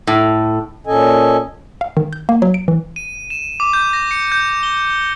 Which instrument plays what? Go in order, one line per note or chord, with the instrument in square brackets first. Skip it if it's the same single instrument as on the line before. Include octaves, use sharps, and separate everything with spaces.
[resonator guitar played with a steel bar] A2
[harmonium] A#2 C#4 A4 D#5 G#5
[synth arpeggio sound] F5
D#3
G6
A#3
F#3
D7
E3
[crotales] D#7
E7
D6
G6
A#6
C#7
G6
G7